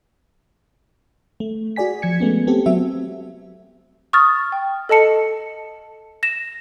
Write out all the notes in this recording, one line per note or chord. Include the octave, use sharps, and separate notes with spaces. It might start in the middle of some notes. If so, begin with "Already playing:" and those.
A3
F#4 G#4 D5 G#5 B6
F3 G#6 C#7
G#3 A3 B3 C#4
A3 B3 C4 G4 A4
F#3 C4 F#4 E5
C#6 D#6 F6 A6
G5
A4 D#5 A5 C#7
A#6 E7